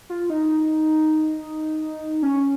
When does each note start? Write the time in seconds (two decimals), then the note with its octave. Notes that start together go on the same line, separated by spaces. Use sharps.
0.10 F4
0.30 D#4
2.23 C#4